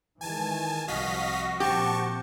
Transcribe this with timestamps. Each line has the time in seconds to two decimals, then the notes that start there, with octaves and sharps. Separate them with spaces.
0.21 D#3 E3 G#3 G#5 A5
0.88 C2 F3 F#4 D#5 F5 B6
1.60 A#2 F3 C4 G4 A5 C#6